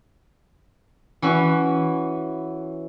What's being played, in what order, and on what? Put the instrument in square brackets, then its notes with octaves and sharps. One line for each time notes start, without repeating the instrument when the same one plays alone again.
[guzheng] E3 C#4 F#4